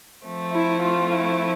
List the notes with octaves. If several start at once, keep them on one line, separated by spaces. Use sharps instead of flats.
F3 A3 C4
E4
F4
E4